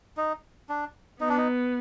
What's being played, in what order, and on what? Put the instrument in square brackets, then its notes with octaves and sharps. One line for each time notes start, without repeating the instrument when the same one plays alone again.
[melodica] D#4
D4
[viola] B3 [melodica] D#4
[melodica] D4
D#4